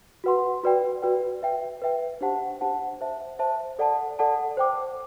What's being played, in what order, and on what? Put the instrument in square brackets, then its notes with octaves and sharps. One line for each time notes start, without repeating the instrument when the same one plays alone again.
[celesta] F#4 B4 F#5 C6
F#4 B4 D5 G5
F#4 B4 D5 G5
B4 E5 G5
B4 E5 G5
D4 G4 C5 F#5 A5
D4 G4 C5 F#5 A5
C5 E5 A5
C5 E5 A5
A4 D5 F#5 A5
A4 D5 F#5 A5
C5 G5 D6